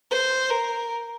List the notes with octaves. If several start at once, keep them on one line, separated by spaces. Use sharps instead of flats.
C5
A#4